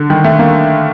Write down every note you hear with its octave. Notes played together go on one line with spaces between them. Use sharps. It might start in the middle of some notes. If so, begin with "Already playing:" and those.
Already playing: D3
D#3
A3
A#3